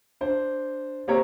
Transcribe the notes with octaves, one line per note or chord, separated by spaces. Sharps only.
D4 C5
A#3 C4 G4 C#5 A#5